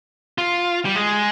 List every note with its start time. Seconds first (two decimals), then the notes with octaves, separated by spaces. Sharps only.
0.38 F4
0.85 G3
0.96 G#3